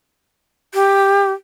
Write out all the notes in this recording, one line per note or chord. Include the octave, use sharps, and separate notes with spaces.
G4